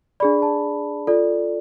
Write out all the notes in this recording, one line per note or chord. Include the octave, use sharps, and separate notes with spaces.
D4 G#4 D5 B5
A5
F4 A4 D5